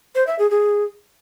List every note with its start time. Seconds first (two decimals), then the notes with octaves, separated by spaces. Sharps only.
0.15 C5
0.27 E5
0.39 G#4
0.51 G#4